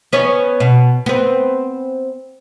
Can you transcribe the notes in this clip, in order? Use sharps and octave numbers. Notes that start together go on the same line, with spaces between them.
B3 C#4 C#5
B2
B3 C4